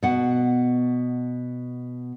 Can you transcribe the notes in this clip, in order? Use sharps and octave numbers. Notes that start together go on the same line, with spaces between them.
B2 F#5